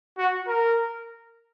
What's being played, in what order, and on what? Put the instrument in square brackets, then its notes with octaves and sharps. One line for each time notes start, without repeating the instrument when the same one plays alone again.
[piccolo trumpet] F#4
A#4